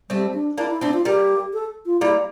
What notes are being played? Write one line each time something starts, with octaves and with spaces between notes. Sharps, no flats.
G3 A3 C4
D4
A#3 D4 E4
E4
A3 C4 D4
F4
G3 A#3 G4
A4
F4
G3 A#3 E4